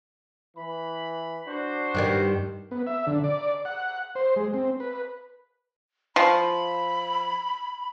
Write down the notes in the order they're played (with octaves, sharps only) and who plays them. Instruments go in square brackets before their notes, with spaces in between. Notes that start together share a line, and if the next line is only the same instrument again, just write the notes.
[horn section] E3 B5
D4 F#4 C5
[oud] G2 D#3 G3
[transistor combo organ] B3
E5
D3
D5
F#5
C5
G#3
C4
B4
[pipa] F3 [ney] B5